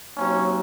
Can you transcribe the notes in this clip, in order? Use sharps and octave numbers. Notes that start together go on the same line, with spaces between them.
C3 F#3 A#3 C#4 D#4 F#4